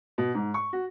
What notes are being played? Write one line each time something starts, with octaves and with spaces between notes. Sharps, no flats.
B2
G#2
C#6
F#4